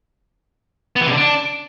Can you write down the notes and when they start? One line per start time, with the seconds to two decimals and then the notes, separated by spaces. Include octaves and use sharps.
0.96 B3
1.01 E3
1.07 C3
1.12 D3
1.17 D4